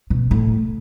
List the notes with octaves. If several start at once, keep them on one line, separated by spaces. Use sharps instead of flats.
B2
A2